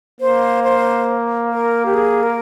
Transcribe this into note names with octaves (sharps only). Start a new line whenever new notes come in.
A#3 C5
C5
A#4
G4
G#4
A#4